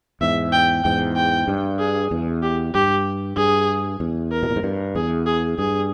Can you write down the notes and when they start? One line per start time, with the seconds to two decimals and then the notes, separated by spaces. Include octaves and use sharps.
0.21 E2 G#2 E5
0.52 G5
0.84 E2 G#2 G5
1.16 G5
1.48 G2
1.79 G#4
2.11 E2
2.43 G4
2.74 G2 G4
3.37 G2 G#4
4.00 E2
4.32 A#4
4.43 B2
4.50 A#2
4.56 G#2
4.63 G2
4.95 E2 G#4
5.26 G#4
5.58 G2 G#4